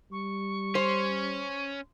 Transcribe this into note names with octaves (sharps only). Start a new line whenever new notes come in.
G3 C#6
C#4 C5